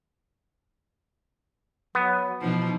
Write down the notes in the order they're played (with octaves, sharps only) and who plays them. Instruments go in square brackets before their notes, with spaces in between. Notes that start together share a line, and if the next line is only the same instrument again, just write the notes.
[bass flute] F#3 [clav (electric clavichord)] B3
[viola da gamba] B2 E3 F3 [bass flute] D#4